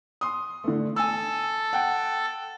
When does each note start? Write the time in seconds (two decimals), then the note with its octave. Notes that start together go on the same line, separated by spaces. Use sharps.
0.21 C6 D#6
0.64 D3 A3
0.96 A4 G#5 E6
1.73 F#5 G5